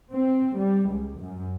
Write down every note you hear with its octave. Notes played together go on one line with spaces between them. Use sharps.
C4
G3
C#2
F#2